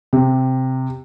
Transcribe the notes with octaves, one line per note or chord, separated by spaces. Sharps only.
C3